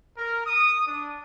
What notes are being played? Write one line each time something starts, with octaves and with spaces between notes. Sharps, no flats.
A#4
D#6
D4